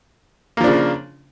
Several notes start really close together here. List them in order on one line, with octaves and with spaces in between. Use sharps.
A#3 F3 D4 C#3